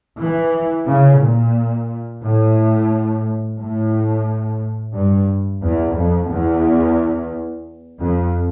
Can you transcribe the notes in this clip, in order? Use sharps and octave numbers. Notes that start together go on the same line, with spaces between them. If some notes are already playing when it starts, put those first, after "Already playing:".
E3
C#3
A#2
A2
A2
G2
E2
F2
E2
F2